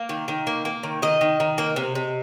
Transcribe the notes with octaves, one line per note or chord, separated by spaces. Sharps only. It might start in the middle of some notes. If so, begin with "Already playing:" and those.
Already playing: A#3 F5
D#3
D#3
A#3
A#3
D#3
D#3 D#5
D#3
D#3
A#3
C3
C3